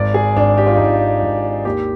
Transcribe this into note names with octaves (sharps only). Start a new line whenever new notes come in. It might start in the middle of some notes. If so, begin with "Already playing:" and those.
Already playing: G#1 D5
G#4
G#1 D4
G4
F4
G#1 D#4
F4
G#1
D#2 G4